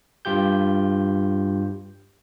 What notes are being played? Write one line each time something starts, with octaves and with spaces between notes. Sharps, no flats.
G2 F4 G4 G6